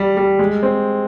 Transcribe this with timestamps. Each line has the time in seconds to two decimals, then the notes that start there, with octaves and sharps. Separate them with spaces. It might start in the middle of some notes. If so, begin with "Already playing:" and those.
Already playing: G3
0.17 G3
0.39 G#3
0.63 C4